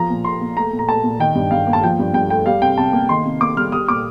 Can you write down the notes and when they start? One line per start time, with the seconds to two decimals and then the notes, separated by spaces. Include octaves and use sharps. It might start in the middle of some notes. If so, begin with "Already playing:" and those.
Already playing: F3 A#5
0.10 A#2
0.24 A#2 C6
0.41 A#3
0.57 A3 A#5
0.73 A#2
0.79 A#5
0.88 A3 A5
1.04 A#2
1.20 D#3 G5
1.35 G2
1.51 G2 F5
1.67 A#3
1.73 A5
1.83 F3 G5
1.99 G2
2.14 G2 G5
2.30 A3 G5
2.46 G3 F5
2.62 C3 G5
2.78 C3 A5
2.93 A#3
3.09 D#3 C6
3.25 C3
3.41 A#3 D6
3.57 G3 F6
3.72 G3 D#6
3.88 A#2 D6